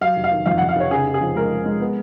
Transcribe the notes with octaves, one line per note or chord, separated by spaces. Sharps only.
F#3 F5
F1
F5
D#3
F2 F5
F2 F#5
F5
F1 C#5
C#3 G#4
C#3
G#4
F3
G#3 A#4
F3
G#3
B3